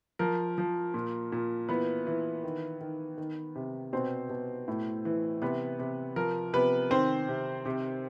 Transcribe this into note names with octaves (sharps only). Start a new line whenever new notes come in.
F3 A#4
F3
A#2
A#2
E3 B3 B4
E3
D#3
D#3
D#3
C3
B2 C4 C5
B2
A2
E3
C3 B3 B4
C3
F3 A#4
C3 B3 B4
D#3 C4 C5
C3
C3